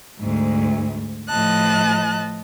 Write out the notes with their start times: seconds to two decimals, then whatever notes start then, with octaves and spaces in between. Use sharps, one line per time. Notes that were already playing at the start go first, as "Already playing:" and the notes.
0.19 D2 G#2
1.29 A2 F3 D#5 A5 F#6